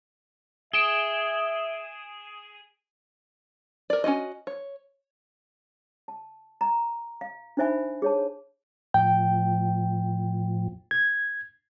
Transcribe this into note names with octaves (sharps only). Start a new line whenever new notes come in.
G#4 E5 D7 E7 G7
A#4 D5
C#4 F4 F#4 D#5
C#5
A5
A#5
F5
D4 D#4 C5 E5 G#5 B5
G#4 C#5 A5
A2 F3 G5
G#6